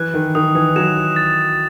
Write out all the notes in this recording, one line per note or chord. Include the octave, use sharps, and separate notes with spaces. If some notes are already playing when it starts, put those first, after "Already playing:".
Already playing: E3 F#6
D#3
D#3 D#6
E3
F#3 E7
A6